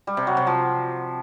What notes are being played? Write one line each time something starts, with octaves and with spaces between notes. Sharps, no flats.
G3
C3
F#3
C3
F3